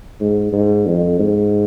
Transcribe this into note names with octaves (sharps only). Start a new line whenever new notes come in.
G#2
G#2
F2
G#2